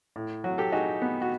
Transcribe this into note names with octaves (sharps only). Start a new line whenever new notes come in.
A2
F#3 F#4
G4 A4
D#4 F#4 G#4
B3
F#4